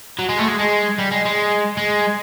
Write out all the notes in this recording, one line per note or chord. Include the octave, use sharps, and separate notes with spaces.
F#3
G#3
A3
G#3
G#3
G3
G#3
G#3
G#3